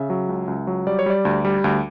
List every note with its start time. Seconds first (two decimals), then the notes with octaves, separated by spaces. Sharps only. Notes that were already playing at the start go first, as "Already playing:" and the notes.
Already playing: C#3 E5
0.10 F#3
0.29 C#2
0.48 C#2
0.67 F#3
0.87 G3 D5
0.99 C#5
1.06 G3 D5
1.25 D2
1.45 G3
1.64 D2